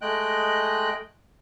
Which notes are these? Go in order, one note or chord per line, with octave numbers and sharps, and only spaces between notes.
G#3 A3 D#5 G5 F#6